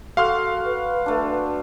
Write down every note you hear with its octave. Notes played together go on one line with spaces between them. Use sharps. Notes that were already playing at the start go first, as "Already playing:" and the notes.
F#4 A4 F5 C6 F6
B4
A3 D4